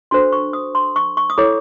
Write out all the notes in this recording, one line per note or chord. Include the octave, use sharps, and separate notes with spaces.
D4 F#4 A4 C5 C6
C#6
D#6
C6
C#6
C#6
D#6
E4 A4 C#5 D6